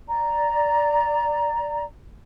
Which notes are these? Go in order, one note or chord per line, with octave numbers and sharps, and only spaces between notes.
D5 A#5